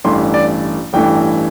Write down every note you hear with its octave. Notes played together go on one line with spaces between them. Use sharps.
A1 G2 E3 A3 C6
D5
A1 G2 E3 A3 G5